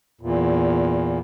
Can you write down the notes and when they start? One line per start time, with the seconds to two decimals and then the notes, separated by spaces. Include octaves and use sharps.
0.21 E2 A#2